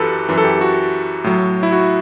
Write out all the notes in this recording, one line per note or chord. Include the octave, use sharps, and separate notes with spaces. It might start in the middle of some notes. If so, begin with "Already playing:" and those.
Already playing: F#2 E3 F#4 G4 A4 B4
F#2 E3
A4
G4
F#4
A2 F#3
E4
F#4